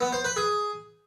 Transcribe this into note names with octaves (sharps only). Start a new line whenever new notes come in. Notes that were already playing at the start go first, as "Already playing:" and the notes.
B3
C5
B4
G#4